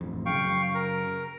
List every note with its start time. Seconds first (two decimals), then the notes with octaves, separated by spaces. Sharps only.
0.01 A1 F2
0.26 F#2 C#3 F5 G5 C#6
0.75 A#4